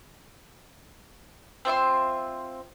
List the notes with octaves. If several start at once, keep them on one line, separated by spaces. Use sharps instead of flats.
C4 F4 E5 C6